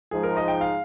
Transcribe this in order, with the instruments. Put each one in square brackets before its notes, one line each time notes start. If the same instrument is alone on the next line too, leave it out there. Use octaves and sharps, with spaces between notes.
[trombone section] G#2 F3 G#3 D#4 [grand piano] G#4
[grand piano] A#4
D#5
G5
F5